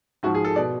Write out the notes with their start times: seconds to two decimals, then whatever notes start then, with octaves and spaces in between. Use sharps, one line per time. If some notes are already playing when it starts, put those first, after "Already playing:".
0.23 G#2 F#4
0.26 F3
0.35 G#4
0.45 A4
0.56 B2 D5